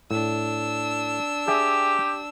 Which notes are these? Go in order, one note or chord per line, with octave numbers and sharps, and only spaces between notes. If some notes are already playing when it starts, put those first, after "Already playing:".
A2 D4 E6
G4 G#4 E5 G5